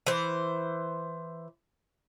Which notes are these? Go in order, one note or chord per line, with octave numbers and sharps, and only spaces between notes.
E3 C5